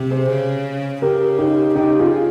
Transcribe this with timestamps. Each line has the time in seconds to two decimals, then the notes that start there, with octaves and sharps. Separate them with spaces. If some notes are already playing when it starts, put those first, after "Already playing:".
Already playing: C3
0.11 G#4 C5
0.29 C#3
1.02 C#3 G4 A#4
1.38 D#4 G4
1.75 C#3 D#4 G4
1.99 F4 G#4